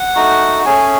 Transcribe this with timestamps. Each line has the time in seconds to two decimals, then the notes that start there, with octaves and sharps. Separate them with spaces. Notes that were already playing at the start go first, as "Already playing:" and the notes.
Already playing: F#5
0.15 A3 D#4 F#4
0.66 A3 C#4 G#4 G#5